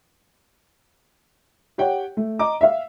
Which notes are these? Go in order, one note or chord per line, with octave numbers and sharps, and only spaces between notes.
G4 C#5 F#5 G5
A3
D#5 A#5 D6
E5 F5